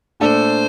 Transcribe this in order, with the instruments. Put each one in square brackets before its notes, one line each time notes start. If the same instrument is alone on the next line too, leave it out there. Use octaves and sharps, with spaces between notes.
[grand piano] A#2 A3 D4 A4 D5 [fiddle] C5